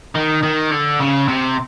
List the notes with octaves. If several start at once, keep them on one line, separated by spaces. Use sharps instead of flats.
D#3
D#3
D3
C#3
C3